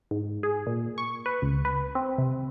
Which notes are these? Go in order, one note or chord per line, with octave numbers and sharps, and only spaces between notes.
G#2
G#4
A#2
C#6
B4
C#2
B4
C4
C3